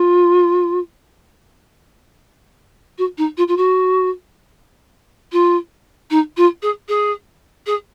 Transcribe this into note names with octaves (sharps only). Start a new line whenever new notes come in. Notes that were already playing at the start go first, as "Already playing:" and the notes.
Already playing: F4
F#4
D#4
F4
F4
F#4
F4
D#4
F4
G#4
G#4
G#4